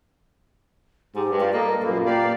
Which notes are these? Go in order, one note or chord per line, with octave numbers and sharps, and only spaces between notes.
G#2 G4
G2
F4 G4 D5 F5
A#3 A4 D#5
F#2 A#2 A#3 B4
A#3 G4 D5 F5